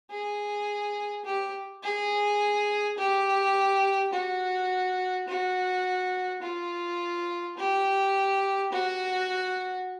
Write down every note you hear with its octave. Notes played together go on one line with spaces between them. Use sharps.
G#4
G4
G#4
G4
F#4
F#4
F4
G4
F#4